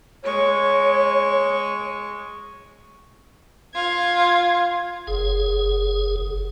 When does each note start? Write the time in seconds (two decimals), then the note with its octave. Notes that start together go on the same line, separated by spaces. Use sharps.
0.24 G#3 C#5 C#6
3.74 F4 G#6
5.07 F#1 G#4